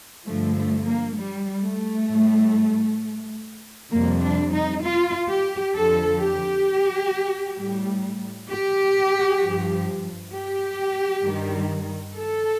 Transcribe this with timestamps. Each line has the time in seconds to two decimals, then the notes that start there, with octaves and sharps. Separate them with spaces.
0.25 G2 D3 F3 A3
0.55 A3
0.86 A#3
1.17 G3
1.62 A3
2.09 A2 G3
3.91 F2 C3 G3 A#3
4.22 D4
4.52 D#4
4.83 F4
5.29 G4
5.74 F2 D3 F3 A4
6.20 G4
7.57 A2 G3
8.49 G4
9.41 G2 F3
10.32 G4
11.23 G2 D#3 G3
12.14 A4